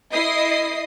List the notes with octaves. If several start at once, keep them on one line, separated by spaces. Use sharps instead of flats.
E4 D#5 D#6 C7